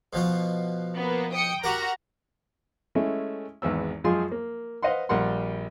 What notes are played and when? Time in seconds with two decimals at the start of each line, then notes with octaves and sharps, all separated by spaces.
0.13 B2 F3 F#4
0.97 A#3 B3
1.33 G5 D#6 C#7
1.64 F#4 G4 A#4 F#5 A#5
2.95 G#3 A3 C#4 E4
3.62 G#1 E2 B3 E6
4.04 F#2 F3 G#3 F4 G#4 C6
4.32 A#3
4.82 B4 C5 D#5 F5 F#5 C6
5.09 A#1 G3 A#4 F#5 C6